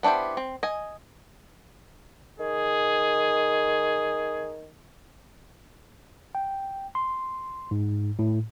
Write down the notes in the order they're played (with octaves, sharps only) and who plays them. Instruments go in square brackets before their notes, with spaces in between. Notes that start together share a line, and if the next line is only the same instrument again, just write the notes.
[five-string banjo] B3 D4 E4 G4 C5
C4
D#5 G#5
[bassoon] D#3 [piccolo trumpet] G#4
[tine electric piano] G5
C6
G#2
A2